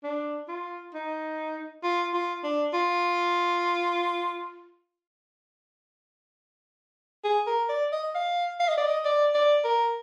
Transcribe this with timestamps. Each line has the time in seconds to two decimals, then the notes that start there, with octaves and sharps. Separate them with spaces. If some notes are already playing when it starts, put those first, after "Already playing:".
0.04 D4
0.48 F4
0.94 D#4
1.83 F4
2.14 F4
2.43 D4
2.74 F4
7.24 G#4
7.47 A#4
7.69 D5
7.92 D#5
8.15 F5
8.60 F5
8.68 D#5
8.78 D5
8.86 D#5
9.05 D5
9.34 D5
9.64 A#4